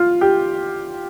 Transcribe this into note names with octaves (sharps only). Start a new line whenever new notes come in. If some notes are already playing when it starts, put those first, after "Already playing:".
Already playing: F4
G4